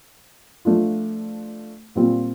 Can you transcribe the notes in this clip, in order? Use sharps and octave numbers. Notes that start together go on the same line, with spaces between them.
F3 A3 D4 F4
A#2 G3 C4 F4